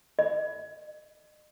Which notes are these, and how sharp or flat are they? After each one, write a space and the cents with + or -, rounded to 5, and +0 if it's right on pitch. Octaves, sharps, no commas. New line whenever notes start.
D#5 -40